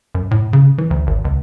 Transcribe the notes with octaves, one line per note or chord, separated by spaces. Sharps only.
F#2
A2
C#3
E3
D2
G#1
C#2